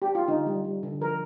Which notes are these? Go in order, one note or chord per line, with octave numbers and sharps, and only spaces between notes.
G4
F4
D3 D#4
G3
G3
D3
F3 A#4